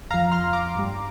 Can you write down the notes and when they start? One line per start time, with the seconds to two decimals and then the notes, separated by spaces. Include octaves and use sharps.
0.10 F2 F3 F5 A#5
0.31 C6 F6
0.53 A#5 D6
0.75 G2 G3